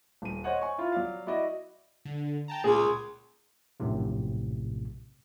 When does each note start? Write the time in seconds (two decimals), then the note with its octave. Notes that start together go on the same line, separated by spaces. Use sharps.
0.22 D#1 D#7
0.44 C5 C#5 D#5 F#5
0.62 G#5 C#6
0.78 E4 F4
0.92 F#3 D5 F5
1.27 E4 F#4 D5 D#5
2.05 D3
2.48 G5 A5 A#5
2.64 C#2 A#2 G#4 G#6
3.80 A#1 F#2 A2 C3